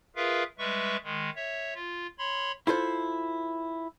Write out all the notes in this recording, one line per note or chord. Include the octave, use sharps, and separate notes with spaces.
F4 G#4 A#4 B4 E5 F5
G3 G#3 B4 E5 C#6
D#3 G#3
C#5 E5
F4
C#5 B5 C6
E4 F4 A4 C5